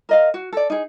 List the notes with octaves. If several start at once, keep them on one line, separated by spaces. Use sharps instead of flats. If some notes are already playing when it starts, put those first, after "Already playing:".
A#4 D#5 F5
F#4
A4 D5
D#4 G#4